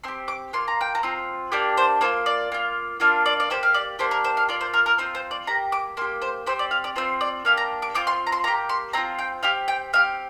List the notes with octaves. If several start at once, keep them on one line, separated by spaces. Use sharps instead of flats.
C4 G4 C6
D6
A#3 F4 C6
A#5
G5
A#5
C4 F4
A#3 D4 G4 D6
C5
A#3 F4 C5
D5
A#3 F4
A#3 D4 F4 F5
D5
D5
A#3 G4 C5
F5
D5
A#3 D4 G4 C5
A#4
C5
F5
A#3 F4 D5
C5
A#4
A#4
C4 F4 C5
C5
D5
A#3 G4 A#5
D6
A#3 G4 C6
C5
C4 G4 C5
D5
F5
D5
C4 F4 C5
D5
A#3 D4 G4 F5
A#5
D6
C4 F4 D6
C6
A#5
C6
A#3 G4 A#5
C6
C4 F4 A#5
G5
C4 G4 F5
G5
C4 G4 F5